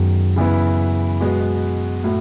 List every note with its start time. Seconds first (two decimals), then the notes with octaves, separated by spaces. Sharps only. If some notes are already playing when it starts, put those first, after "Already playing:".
Already playing: F#2 D#3 G#3 B3 F#4
0.36 C#3 E3 B3 E4
1.20 B2 G#3 B3
2.04 A2 F#3